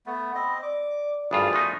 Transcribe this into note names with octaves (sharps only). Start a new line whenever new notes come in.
A3 B3
C4 D#5 B5
D5 D6
G#1 G2 A3 F4 G#4 D5 B5
F3 B3 D#4 C#6